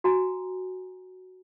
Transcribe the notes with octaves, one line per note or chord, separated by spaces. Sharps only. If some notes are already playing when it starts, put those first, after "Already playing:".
F#4 G#5 A#5